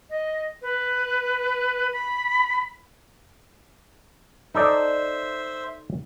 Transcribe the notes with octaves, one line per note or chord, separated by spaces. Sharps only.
D#5
B4
B5
D#4 A4 C5 D5 E5